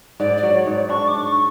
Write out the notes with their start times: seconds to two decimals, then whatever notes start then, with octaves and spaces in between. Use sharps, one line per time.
0.20 G#2 D5
0.37 D5
0.43 F#3
0.54 C#5
0.66 G#2
0.72 D5
0.89 D4 C#6
1.08 D6
1.14 D4
1.25 C#6